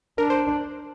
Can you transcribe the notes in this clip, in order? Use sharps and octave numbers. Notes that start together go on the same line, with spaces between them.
D4 A#4
C5